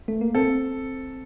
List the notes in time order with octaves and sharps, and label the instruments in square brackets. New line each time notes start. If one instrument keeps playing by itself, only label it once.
[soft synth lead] A3
A#3
[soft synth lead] C4 [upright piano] A4